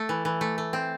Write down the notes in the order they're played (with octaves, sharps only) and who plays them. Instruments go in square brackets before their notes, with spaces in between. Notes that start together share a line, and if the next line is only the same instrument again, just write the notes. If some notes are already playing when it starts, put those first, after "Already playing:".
Already playing: [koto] A3
E3
E3
A3
A3
C4